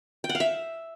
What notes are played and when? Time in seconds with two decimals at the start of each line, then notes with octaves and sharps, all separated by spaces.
0.24 G5
0.29 F#5
0.35 F5
0.40 E5